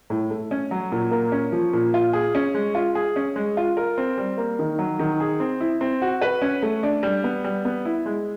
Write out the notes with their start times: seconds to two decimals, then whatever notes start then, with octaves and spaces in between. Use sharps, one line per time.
0.10 A2
0.30 A3
0.51 C#4
0.71 F#3
0.92 A#2
1.11 A#3
1.32 C#4
1.52 F3
1.73 A#2
1.94 F4
2.13 G#4
2.35 C#4
2.54 G#3
2.75 F4
2.95 G#4
3.16 C#4
3.36 G#3
3.57 F4
3.77 A#4
3.98 C4
4.18 G3
4.37 A#3
4.59 D#3
4.79 F#3
4.99 D#3
5.20 G#4
5.40 C4
5.60 E4
5.81 C4
6.02 F#4
6.21 B4
6.42 C#4
6.62 A3
6.83 D4
7.03 G3
7.24 B3
7.44 G3
7.65 B3
7.85 E4
8.06 G#3